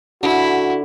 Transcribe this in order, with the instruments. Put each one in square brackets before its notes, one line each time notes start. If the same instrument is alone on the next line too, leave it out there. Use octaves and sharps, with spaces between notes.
[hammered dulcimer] D3 [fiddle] E4 [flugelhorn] F#4